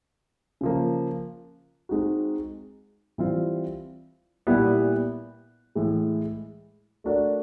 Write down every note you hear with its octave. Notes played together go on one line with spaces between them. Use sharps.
C#3 F3 A#3
G#3 C4 D#4 F#4
E3 G3 C4 F4
A#2 G3 B3 E4 G4
A2 E3 G#3
A3 D4 F#4 A#4 D5